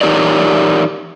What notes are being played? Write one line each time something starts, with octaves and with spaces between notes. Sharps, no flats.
E3 D#4 G4 A#4 C#5 D5